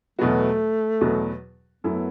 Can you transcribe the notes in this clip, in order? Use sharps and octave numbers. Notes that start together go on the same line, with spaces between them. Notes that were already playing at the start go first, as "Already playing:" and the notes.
E2 B2 F#3 A3 B3 F#4
E2 B2 F#3 B3 F#4
F#2 F#3 A3 B3 E4 A4